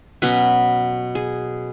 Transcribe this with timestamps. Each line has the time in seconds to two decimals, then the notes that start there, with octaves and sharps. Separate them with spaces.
0.22 B2 F#3 C#4 B4
1.15 G#4